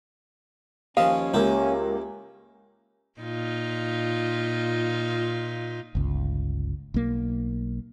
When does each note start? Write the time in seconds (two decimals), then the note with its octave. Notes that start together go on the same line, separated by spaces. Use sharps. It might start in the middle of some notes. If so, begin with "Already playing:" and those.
0.97 D#2 F3 C#4 D#5 F5 A5
1.34 C#2 A#3 E4 G4
3.20 A#2 D#4 F4
5.95 G1 C#2
6.94 B1 A#3